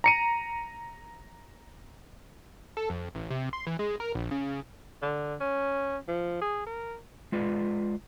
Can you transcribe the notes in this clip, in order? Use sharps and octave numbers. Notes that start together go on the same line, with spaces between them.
A#5 C#7 D#7
A4
F2
A1
C3
C6
E3
G#3
A#4
A#1
C#3
D3
C#4
F3
G#4
A#4
G#3 F4 B4 D5